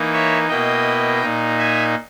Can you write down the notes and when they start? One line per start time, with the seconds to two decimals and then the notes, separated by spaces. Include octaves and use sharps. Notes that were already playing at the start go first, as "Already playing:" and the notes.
Already playing: E3 A#3 D#4
0.13 C#5 E5
0.49 B2 A#3 E4 D#5 G5
1.22 A#2 A#3 D#4
1.58 E5 G#5